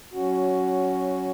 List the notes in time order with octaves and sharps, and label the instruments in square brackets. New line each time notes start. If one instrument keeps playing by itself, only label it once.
[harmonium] F#3 C#4 F#4